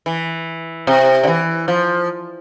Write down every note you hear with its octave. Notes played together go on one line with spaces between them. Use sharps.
E3
C3
D3
E3
F3